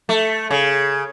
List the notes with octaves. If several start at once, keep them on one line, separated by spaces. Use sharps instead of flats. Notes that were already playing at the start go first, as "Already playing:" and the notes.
A3
C#3